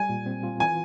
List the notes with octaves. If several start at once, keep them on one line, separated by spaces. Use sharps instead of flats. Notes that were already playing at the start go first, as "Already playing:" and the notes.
Already playing: G3 G#5
A#2
C4
F4
E3 G#5